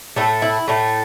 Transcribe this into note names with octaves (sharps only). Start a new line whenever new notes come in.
A2 A3 A4
E4
A2 A3